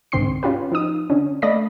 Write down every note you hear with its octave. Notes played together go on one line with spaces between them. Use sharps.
C2 G#2 D3 C4 C6 C7
C#4 F4 G4 B4
F3 D#4 D#6
D3 C#4
A3 D5 D#5 B5 A#6